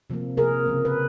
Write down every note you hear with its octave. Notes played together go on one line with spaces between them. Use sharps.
C3 F3 A#3
C3 F3 A#3 G#4 A#4
C#3 F3 A#3
B4